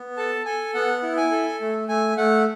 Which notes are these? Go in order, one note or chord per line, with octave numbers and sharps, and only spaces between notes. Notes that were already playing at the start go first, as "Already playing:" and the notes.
Already playing: B3
A4 A5
A4 G#5
B3 F#5
E4
G#5
A4
A3
A3 G#5
A3 F#5